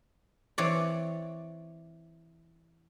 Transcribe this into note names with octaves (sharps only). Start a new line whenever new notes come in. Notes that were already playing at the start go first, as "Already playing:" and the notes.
E3 C4 C#5 D5